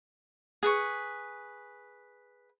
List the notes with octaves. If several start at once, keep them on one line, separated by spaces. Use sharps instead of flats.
G#4 B4 C#6